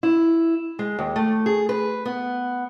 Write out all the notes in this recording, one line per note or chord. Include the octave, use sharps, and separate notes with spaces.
E4
G#3
D#2
A3
G#4
B4
B3